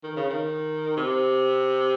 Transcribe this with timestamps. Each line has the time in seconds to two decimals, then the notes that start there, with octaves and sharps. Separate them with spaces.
0.04 D#3
0.16 C#3
0.30 D#3
0.97 C3